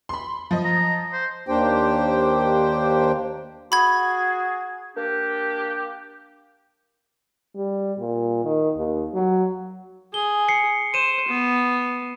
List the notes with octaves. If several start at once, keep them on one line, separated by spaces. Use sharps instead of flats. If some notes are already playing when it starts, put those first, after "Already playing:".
B5 C6
F3 D#5
A#5
C5
D#2 A#3 D4 G4 C5 G5
F#4 G#4 B5 G#6
A#3 D4 G4
G3
A#2
D#3
D#2
F#3
G#4 G7
C7 C#7
C5 D#7 E7
B3